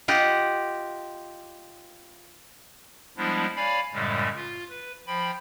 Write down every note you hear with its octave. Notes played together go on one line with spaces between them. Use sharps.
F4 G4 D#5 F#5
F3 G3 G#3 B3 D4 E4
C#5 D5 F5 G#5 B5
F#2 A2 C#3 G3 G#3
F4
B4
F3 G5 B5